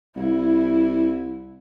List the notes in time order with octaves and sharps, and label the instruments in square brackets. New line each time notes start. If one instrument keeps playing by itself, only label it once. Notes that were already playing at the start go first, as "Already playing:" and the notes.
[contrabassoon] C2 [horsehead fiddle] E4